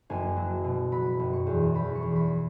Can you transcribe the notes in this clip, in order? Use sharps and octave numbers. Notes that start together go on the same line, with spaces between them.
F#1 G#5
F#3
B2
F#3 B5
F#1
C#6
E2
E2 B5
C#6
E2
B5